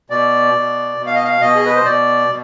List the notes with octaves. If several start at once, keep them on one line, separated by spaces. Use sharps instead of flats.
B2 D5
B2
B2
F5
D#5
F5
B2 D#5
G#4
B4
C5
B2 D5
B2